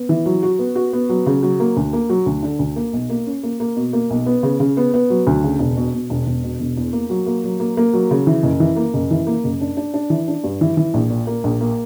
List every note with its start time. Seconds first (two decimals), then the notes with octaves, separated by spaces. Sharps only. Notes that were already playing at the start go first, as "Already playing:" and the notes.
Already playing: B3
0.09 E3
0.26 F#3
0.43 F#4
0.59 B3
0.75 F#4
0.93 B3
1.09 F#3
1.26 C#3
1.43 F#3
1.60 A#3
1.77 D2
1.93 A#3
2.09 F#3
2.26 D2
2.43 D3
2.59 D2
2.76 A#3
2.93 B1
3.10 A#3
3.26 C#4
3.43 A#3
3.60 A#3
3.76 B2
3.93 A#3
4.10 B1
4.26 B3
4.43 C#3
4.60 C#3
4.77 B3
4.94 B3
5.10 F#3
5.27 D2
5.44 C#3
5.59 E1
5.77 B2
5.94 B2
6.10 E1
6.26 E1
6.44 B2
6.60 E1
6.77 E2
6.93 A#3
7.10 F#3
7.27 A#3
7.44 F#3
7.60 A#3
7.77 A#3
7.93 F#3
8.11 C#3
8.27 E3
8.43 F#1
8.60 E3
8.76 A#3
8.94 F#1
9.11 E3
9.27 A#3
9.44 F#1
9.61 D4
9.77 D4
9.94 D4
10.10 E3
10.28 D4
10.44 G2
10.61 E3
10.77 E3
10.94 A#1
11.10 A#2
11.27 A#3
11.44 A#1
11.61 A#3